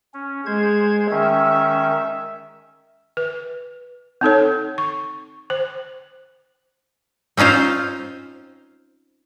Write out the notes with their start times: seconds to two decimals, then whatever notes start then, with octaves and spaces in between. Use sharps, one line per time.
0.14 C#4
0.46 G#3 C5 G#6
1.11 D#3 C#4 E5
3.17 B4
4.21 C4 D#4 A4 C#5
4.78 C#6
5.50 C5
7.37 C4 C#4 D#4 F4 C5